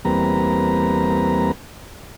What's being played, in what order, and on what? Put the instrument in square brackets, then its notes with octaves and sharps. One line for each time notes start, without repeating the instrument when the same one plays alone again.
[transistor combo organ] E2 G3 A#3 C4 B4 A#5